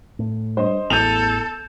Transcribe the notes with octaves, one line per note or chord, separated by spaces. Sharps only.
A2
G2 C5 D#5
A1 E2 A4 G6 D#7 F7